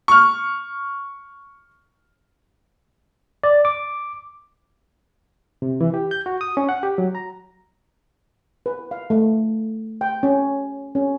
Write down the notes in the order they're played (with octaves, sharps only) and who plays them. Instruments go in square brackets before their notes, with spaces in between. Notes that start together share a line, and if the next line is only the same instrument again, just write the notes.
[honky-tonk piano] C#6 F6
[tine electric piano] D5
D6
[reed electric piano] C3
E3
G4
G6
F#4
D#6
C#4
F#5
G4
F#3
A#5
[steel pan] B4
F5
A3
G5
C#4
C#4